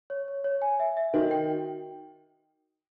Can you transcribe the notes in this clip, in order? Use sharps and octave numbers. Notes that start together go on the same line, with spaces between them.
C#5
C#5
C#5
G#5
E5
E5
D#3 F#4
G5